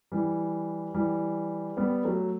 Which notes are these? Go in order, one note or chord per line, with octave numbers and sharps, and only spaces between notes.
E3 G3
E3 G3
G3 B3
F#3 A3